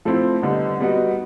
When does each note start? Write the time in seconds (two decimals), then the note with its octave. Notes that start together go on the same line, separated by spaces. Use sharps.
0.05 F3 A3 C4 E4
0.42 D3 G3 B3 D#4
0.80 G3 B3 D#4 F#4